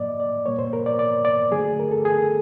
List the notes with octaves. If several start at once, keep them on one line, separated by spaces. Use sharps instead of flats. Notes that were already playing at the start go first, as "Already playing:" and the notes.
Already playing: A2 F#3 A#3 D5 D#5
D5
A#2 G3 A#3 C#5
C5
A#4
D5
D5
D5
D3 F#3 A3 G#4
A#4
A4
G#4